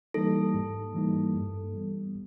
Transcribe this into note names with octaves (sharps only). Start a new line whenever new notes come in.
E3 G3 A#3 D#4 A4
G#2
E3 G3 A#3 D#4
G2
E3 G3 B3